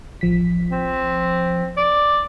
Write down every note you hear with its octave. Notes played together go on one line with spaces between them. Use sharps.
A1 F3 B6
C4
D5